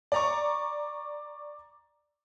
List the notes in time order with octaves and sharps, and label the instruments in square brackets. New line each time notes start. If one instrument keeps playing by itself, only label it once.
[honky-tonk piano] D5 A#5 C#6